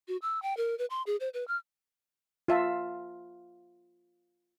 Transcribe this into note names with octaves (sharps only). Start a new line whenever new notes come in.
F#4
E6
G5
A#4
B4
C6
G#4
C5
B4
F6
F4 E5 A5